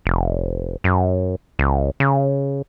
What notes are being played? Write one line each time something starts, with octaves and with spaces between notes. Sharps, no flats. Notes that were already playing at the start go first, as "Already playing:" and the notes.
F1
F#2
C#2
C#3